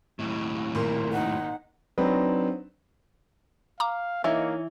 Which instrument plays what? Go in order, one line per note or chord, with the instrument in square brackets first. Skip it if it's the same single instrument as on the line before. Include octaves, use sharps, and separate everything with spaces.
[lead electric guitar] D#2 A2
[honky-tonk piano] G#1 A#2 C6 [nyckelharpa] A#4
[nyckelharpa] D#4 [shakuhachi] F#5
[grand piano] F#3 C4 D4 D#4 B4
[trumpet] F5 [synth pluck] A#5 D6
[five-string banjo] E3 [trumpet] A#3 [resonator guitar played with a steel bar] D#4 C#5 E5